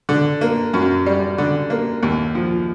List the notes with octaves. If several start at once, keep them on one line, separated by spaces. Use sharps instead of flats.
D3
A#3
F#2
G3
D3
A#3
D#2
F3